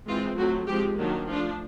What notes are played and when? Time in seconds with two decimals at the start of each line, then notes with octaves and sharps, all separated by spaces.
0.08 E3 G#3 C4 F4
0.38 F#3 A3 C4 F#4
0.67 F3 G#3 C4 G4
0.98 D#3 F#3 A#3 D4
1.27 F3 A3 D4 F4